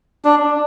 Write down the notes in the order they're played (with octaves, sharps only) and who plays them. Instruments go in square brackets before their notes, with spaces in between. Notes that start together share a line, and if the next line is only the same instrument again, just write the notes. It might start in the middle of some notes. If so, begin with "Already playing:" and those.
[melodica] D4